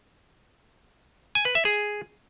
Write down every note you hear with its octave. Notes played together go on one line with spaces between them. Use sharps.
G#5
B4
E5
G#4